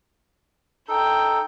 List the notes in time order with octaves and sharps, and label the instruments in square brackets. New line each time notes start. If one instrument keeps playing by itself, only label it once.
[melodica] D#4 A4 [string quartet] G5